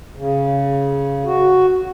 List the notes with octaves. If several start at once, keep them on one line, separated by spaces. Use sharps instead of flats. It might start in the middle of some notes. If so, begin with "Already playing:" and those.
C#3
F#4